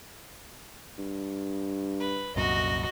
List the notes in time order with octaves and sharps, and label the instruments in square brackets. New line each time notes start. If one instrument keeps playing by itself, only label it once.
[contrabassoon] G2
[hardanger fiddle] B4
[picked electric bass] C2 F#2 A#2 [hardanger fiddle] F#4 D#5